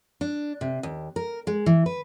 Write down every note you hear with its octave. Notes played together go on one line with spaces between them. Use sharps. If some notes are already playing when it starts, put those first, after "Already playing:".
D4
C3
D#2
A#4
G#3
E3
B4